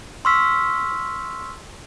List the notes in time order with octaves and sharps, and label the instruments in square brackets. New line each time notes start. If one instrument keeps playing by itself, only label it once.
[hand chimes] C6 C#6 E6 F6 B6